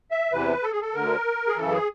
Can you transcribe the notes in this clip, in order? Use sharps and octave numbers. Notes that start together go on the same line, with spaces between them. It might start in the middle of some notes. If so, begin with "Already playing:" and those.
E5
E2 C3 E3 B4
A4
G#4
A4
D2 D3 A#4
G#4
F#2 C#3 E3 A4
G#4